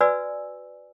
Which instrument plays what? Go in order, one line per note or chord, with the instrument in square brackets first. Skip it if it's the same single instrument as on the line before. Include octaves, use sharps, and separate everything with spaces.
[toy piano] F#4 B4 D5 G#5 E6